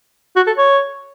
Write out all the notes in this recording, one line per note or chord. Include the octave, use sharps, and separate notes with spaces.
F#4
A4
C#5